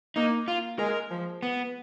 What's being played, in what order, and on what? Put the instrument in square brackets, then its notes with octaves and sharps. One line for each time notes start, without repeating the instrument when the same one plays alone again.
[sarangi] A#3 [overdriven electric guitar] D#4
[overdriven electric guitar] F4
[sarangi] G#3 [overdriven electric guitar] A#4
[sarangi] F3
[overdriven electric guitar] B3